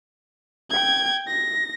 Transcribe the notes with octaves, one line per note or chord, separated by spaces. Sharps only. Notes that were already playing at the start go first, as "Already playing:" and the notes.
G5 G#6
A#6